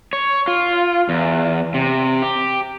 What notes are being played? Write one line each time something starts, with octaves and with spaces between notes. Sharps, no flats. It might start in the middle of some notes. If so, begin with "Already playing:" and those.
C#5
F4
E2
C3
G4